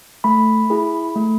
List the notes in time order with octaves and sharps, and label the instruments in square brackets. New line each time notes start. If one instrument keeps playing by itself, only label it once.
[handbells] A3 B5
E4 G#4
A3